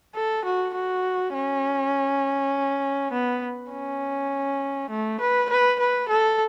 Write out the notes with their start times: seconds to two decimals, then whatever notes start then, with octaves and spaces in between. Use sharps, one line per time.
0.15 A4
0.45 F#4
0.75 F#4
1.34 C#4
3.13 B3
3.72 C#4
4.90 A3
5.21 B4
5.50 B4
5.80 B4
6.09 A4